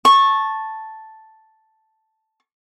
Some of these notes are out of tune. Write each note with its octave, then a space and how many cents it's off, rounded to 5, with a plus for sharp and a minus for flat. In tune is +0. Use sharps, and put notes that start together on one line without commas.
A5 +0 C#6 -15